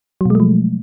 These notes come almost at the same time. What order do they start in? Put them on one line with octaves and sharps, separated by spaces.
F#3 B2 G#3 A3 F3